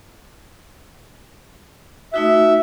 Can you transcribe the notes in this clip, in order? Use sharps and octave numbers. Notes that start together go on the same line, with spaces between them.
A3 D#4 F#4 E5